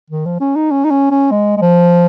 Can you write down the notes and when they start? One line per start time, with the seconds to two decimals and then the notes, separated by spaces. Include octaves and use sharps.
0.10 D#3
0.25 F3
0.40 C#4
0.55 D#4
0.71 C#4
0.84 D#4
0.91 C#4
1.11 C#4
1.31 G#3
1.57 G#3
1.61 F3